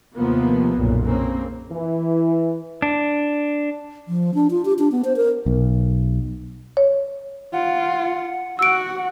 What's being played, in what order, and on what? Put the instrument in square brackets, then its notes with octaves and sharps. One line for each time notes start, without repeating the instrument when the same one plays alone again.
[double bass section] D#2 C3 F3 A#3 B3
B1 F#2 A#2
C#3 A#3 C4
[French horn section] E3
[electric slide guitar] D4
[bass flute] F3
D4
F4
G4
D4
B3
C5
A#4
[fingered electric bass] B1
[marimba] C#5
[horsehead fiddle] F4 [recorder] F#5
[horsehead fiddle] F#4 F#5 [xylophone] E6 D7